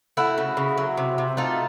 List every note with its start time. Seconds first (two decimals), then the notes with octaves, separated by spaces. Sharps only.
0.17 A3 E4 F#4
0.38 C#3
0.57 C#3
0.78 F#3
0.97 C3
1.18 C3
1.37 A3 D#4 F4